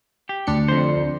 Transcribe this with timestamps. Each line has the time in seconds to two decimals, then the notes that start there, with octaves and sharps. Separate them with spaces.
0.29 G4
0.47 D2 D4 C#7
0.68 F2 C5